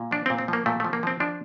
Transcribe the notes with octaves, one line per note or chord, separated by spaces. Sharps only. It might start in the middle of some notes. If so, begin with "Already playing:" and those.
Already playing: A#2
F3 D4
C4
A#2
C4
F3 A#3
A#2 A3
F3 A3
A#3
F3 C4
F3 D4